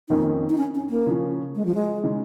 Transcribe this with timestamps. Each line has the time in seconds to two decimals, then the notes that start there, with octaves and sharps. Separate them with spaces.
0.09 F2 D#3 A#3 C#4 D#4
0.50 D#4
0.58 C#4
0.75 C#4
0.90 A#3
1.06 C#3 F3 C#4
1.55 G#3
1.65 F3
1.75 G#3
2.03 C#3 G#3 D#4